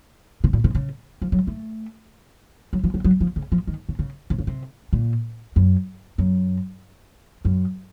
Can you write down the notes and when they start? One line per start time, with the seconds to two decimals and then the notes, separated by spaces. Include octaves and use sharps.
0.44 C3
0.53 A#2
0.64 C3
0.75 C#3
1.22 F3
1.32 F#3
1.47 A3
2.73 F#3
2.84 F3
2.94 F#3
3.04 F#3
3.21 F3
3.36 C#3
3.52 F3
3.67 D#3
3.89 C#3
3.99 C#3
4.30 C3
4.38 C#3
4.47 C3
4.93 A#2
5.56 F#2
6.18 F#2
7.45 F#2